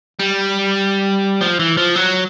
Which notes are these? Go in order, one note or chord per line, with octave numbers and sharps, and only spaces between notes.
G3
F3
E3
F3
F#3